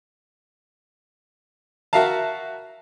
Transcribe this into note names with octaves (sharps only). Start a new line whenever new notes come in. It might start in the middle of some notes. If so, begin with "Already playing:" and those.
F#4 A#4 E5 F5 A5